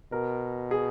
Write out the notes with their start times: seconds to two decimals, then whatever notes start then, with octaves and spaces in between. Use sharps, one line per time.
0.12 B2 A#4
0.71 G#4